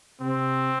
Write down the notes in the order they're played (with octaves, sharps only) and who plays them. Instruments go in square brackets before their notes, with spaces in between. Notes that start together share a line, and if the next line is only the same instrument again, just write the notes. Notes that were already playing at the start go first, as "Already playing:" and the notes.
[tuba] C3 [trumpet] C4